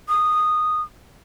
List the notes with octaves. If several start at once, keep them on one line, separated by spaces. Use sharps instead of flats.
D#6